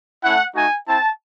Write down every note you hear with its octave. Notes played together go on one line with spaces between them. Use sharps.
A3 C#4 E4 F#5
A3 D#4 F#4 G#5
C4 E4 A5